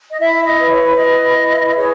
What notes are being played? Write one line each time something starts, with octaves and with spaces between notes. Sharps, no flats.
D#5
E4 E5
D#5
B4
C#5
E4 D#5
B4
G#4 C#5